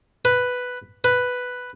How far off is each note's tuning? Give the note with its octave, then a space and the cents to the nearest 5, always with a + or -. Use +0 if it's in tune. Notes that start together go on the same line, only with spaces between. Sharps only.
B4 +5
B4 +5